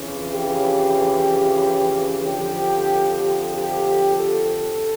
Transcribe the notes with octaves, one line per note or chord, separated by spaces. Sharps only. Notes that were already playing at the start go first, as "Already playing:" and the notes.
Already playing: F2 C#3 E3
G4
F2 D3 F3 G4
G4
A4